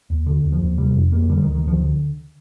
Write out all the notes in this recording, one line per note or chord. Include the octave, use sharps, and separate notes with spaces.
D#2
D3
D#2
F3
D#2
C3 G3
F2
F2 A#3
D3 G3
D#3
D2
D#3
D2 F3
D3